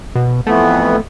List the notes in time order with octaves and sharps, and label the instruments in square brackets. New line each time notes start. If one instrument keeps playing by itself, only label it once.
[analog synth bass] B2
[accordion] F2 E3 B3 [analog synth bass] A3